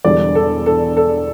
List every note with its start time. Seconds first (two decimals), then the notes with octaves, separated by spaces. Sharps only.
0.04 E1 E2 D3 G3 D5
0.35 A4
0.66 A4
0.97 A4